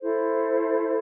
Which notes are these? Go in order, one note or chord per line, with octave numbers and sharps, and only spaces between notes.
E4 A4 C5